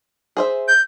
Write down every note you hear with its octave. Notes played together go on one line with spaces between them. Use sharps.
G#4 C5 E5
G6